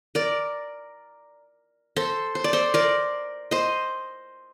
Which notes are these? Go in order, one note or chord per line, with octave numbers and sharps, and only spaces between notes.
A#4 D5
A4 C5
C5
D5
A4 C5
A#4 D5
C5 D#5